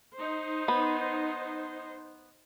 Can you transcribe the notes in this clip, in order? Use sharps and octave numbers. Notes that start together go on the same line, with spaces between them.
D#4 C5
B3